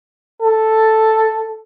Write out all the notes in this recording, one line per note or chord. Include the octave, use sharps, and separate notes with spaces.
A4